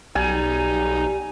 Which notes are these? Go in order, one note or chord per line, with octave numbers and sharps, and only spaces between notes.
B1 G3 D#4 G#5